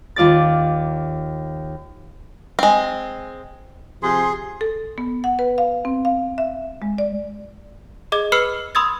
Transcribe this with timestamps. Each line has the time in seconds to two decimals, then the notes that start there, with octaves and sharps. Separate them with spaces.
0.16 D#2 F4 D5 A6
2.59 G#3 C4
4.03 C3 F3 G#4 C6
4.61 A4
4.98 B3
5.24 F#5
5.39 B4
5.58 F5
5.85 C4
6.05 F5
6.38 E5
6.82 G#3
6.98 D5
8.12 G#4 D#5 D6 G#6
8.32 B4 B5 E6 F6 C7 C#7
8.75 B5 C6 D#6 E6 G#6 A6